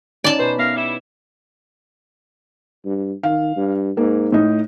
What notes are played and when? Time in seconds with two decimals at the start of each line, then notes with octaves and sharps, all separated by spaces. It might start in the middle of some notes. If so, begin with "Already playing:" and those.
0.24 C#4 D#4 D5 A5
0.39 B2 B4 C5
0.59 B3 A#4 E5 F5
0.76 G3 E4
2.85 G2
3.23 D#3 F5
3.56 G2
3.97 G#2 A#3
4.32 A2 D#4